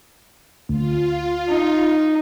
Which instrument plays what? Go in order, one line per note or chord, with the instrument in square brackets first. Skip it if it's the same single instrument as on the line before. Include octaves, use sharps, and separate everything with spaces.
[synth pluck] D2 [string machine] F4
[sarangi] D#4